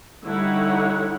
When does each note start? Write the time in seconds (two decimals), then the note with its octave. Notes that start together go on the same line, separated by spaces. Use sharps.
0.25 D3 G3 D#4 E4 C#5 F#5